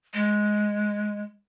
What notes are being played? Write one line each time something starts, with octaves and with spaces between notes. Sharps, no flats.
G#3